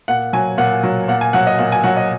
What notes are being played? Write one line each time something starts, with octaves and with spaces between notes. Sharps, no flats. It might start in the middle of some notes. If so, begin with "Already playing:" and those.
A#2 F#5
F#3 G#5
A#2 F#5
F#3
A#2 F#5
G#5
F#3 F#5
D#5
A#2 F#5
G#5
F#3 F#5
D#5